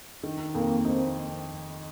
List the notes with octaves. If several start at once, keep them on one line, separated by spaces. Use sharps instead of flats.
D#3
F2 A#3
C4 D#4